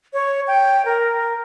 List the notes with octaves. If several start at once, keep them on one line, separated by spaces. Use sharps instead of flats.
C#5
G5
A#4